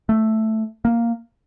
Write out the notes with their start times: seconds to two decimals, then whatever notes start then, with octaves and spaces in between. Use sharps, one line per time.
0.09 A3
0.85 A#3